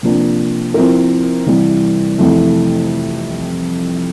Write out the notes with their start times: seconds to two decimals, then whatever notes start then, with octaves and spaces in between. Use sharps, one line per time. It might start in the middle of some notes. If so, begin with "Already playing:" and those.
0.03 C3 F3 A#3 D4
0.74 F3 C4 E4 A#4
1.46 C3 E3 G3
2.18 F2 C3 E3 A3